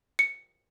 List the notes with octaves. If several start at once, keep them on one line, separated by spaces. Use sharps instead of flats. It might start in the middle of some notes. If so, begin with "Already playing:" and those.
C#7